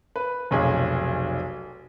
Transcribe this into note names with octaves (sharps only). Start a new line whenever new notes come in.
B4
F1 B1 G#4